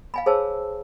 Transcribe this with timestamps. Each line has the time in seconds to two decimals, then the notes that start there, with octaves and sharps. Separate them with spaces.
0.14 F5 G#5 B5
0.26 G#4 C5 C#5 G#5 A5 E6